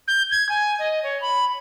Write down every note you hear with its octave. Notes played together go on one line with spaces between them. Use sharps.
G6
G#6
G#5
D#5
C#5
B5